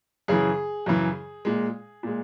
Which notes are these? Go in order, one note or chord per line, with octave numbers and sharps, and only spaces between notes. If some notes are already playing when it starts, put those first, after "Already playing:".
F#2 C#3 E3 G#4
F#2 C#3 E3
A#2 G#3
A#2 G#3